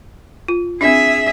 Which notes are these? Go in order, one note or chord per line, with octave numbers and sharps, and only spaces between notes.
F4
C4 D4 G#4 E5